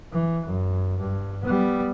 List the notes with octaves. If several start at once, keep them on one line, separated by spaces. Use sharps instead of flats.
E3
F#2
G2
G3 B3